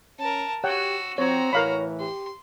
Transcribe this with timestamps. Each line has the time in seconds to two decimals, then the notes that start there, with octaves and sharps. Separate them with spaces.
0.19 C#4 A#4 A5
0.64 F#4 G4 C#5 F#5 G5 E6
1.18 F3 C4 F#4 C#5 A#5
1.53 A2 E3 A#4 C#5 F5 B5
2.00 G4 C6